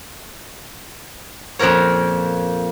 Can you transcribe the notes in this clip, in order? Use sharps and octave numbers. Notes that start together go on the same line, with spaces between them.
F2 A#2 F3 A#4 C#5